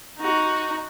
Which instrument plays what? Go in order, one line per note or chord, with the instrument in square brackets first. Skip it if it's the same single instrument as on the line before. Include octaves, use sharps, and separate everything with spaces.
[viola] D#4 F#4